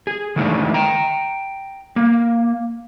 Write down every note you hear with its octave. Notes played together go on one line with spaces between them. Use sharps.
G#4
D#3 E3 G#3 A3 D4
G5 A#5
A#3